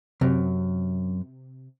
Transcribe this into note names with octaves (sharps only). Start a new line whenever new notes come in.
F#2 C3